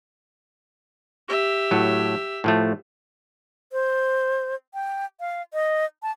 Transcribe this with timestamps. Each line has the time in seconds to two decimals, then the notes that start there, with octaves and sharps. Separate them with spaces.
1.28 G4 E5
1.71 A2 F#3
2.44 A2 F3 A3
3.73 C5
4.74 G5
5.20 F5
5.54 D#5
6.03 A5